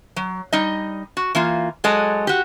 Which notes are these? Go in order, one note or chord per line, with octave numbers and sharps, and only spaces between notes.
F#3
G3 D#4 D#5
F#4
E3 A#3 F4
F#3 G#3 A4 D#5
F#4 G4